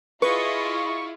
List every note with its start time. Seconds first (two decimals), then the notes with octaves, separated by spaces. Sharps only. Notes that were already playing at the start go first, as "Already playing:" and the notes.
0.22 E4 F4 G#4 B4 D#5 C#6